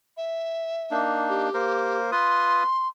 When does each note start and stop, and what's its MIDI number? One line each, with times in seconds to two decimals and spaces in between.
0.17 1.00 76
0.91 1.49 58
0.91 1.49 62
0.91 1.49 63
1.29 1.98 67
1.54 2.11 58
1.54 2.11 70
1.54 2.11 72
2.12 2.63 65
2.12 2.63 71
2.12 2.88 84
2.12 2.63 87